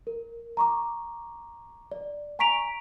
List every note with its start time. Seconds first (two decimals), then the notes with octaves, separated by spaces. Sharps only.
0.07 A#4
0.57 A#5 C#6 D6
1.92 D5
2.39 G#5 A#5 C#6 B6 D7 F7